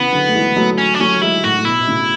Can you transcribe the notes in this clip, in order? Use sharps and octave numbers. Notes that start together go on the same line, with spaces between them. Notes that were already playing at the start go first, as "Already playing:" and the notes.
Already playing: C#3 E3 B3
D3 F#3
A3
E3 G#3
F#3 A3
C#4
D4
F#3 A3 C#4
E3 G#3 E4
A2 F#4
A2
B2 E4
B2
A2 C#3